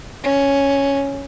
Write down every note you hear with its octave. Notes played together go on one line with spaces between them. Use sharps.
C#4